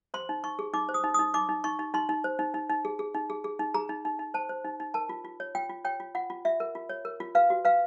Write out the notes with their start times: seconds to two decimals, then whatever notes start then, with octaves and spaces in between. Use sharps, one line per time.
0.14 C5 C6
0.29 D#4
0.44 D#4 C#6
0.59 G#4
0.74 D#4 D6
0.89 C5
0.94 D#6
1.04 D#4
1.14 D#4 D#6
1.34 D#4 D6
1.49 D#4
1.64 D#4 C#6
1.79 D#4
1.94 D#4 C6
2.09 D#4
2.24 C5
2.39 D#4
2.54 D#4
2.70 D#4
2.85 G#4
2.99 G#4
3.14 D#4
3.30 G#4
3.44 G#4
3.59 D#4
3.74 G#4 A#5
3.89 D#4
4.05 D#4
4.19 D#4
4.34 C5 A5
4.49 C5
4.65 D#4
4.80 D#4
4.94 A#4 A5
5.09 F4
5.25 F4
5.40 C#5
5.55 F4 G5
5.69 F4
5.85 C#5 G5
6.00 F4
6.15 F4 F#5
6.30 F4
6.45 F4 E5
6.60 A#4
6.75 F4
6.89 C#5
7.05 A#4
7.20 F4
7.35 B4 F5
7.50 F#4
7.65 B4 F5